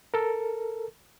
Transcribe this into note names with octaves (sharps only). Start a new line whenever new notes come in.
A4 A#4